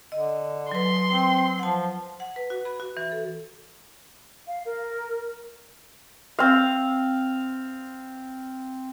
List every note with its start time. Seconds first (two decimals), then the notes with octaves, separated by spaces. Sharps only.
0.12 D3 D#5
0.72 F#3 B4 C6
1.10 C4
1.59 F3 F#5 A5
2.20 F#5
2.36 B4
2.50 F#4
2.65 B5
2.80 F#4
2.97 E3
3.12 A4
4.47 F5
4.65 A#4
6.39 C4 F5